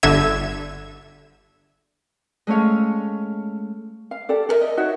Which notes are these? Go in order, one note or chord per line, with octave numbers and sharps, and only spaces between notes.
G1 D3 E5 G#6 E7
G#3 A3 C#4 C#5 F5
F5
G4 A4 D5
A4 A#4 D#5 E5
D#5
D#4 F#4 C#5 E5